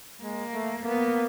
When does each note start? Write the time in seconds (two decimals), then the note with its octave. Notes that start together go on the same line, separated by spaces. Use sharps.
0.23 G#3 A#3
0.54 A3
0.84 A#3 B3